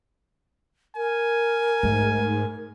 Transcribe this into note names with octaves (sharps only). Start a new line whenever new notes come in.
A#4 G#5
G#2 A3